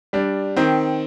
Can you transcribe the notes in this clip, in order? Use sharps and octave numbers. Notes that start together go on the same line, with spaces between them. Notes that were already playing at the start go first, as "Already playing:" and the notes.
G3 D4
D#3 C4